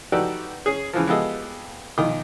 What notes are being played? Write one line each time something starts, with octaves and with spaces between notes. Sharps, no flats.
D#4 F#4 G4 A4 B4 D5
C#4 G#4
C#3 E3 F3
G#3 B3 F4 G4 A4 D#5
B1 D#3 F4 D#5 D6